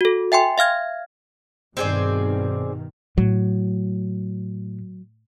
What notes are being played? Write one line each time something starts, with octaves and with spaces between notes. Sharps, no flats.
F#4 A4
E5 G5 G#5 C6
E5 F5 F6 G#6
G2 B2 D#3 C4 G#4 D5
A2 F#3